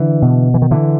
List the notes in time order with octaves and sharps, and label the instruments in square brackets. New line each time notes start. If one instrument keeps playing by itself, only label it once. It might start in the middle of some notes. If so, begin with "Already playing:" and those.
Already playing: [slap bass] D3 E3
B2
E3
D#3
D3 E3